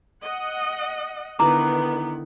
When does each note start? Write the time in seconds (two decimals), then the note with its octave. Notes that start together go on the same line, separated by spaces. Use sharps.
0.23 D#5 F#5
1.39 D3 D#3 B3 E4 B4 A#5 D6